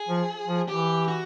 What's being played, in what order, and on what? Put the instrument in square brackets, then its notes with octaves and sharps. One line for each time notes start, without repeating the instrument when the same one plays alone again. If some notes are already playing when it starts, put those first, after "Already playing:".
Already playing: [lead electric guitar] G#4
[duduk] F3
F3
[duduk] E3 [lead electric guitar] G4
[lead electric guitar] F#4